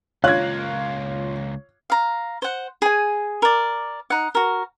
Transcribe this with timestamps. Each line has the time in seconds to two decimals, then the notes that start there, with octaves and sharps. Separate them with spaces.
0.24 C#2 A#3 F4 C#5 F5 F#6 G#6
1.90 F5 A#5
2.42 C5 F#5
2.82 G#4 G#5
3.42 A#4 D5
4.10 D#4 F#5
4.35 F#4 A#4